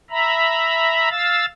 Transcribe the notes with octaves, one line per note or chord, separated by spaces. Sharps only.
E5 A#5 B5
F5 E6 A6